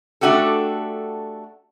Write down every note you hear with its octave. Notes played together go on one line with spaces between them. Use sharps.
A3 D4 F#4 G4 A4